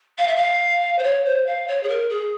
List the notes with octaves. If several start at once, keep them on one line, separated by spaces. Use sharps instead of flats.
F5
E5
F5
C5
C#5
C5
F5
C#5
G#4
A#4
G#4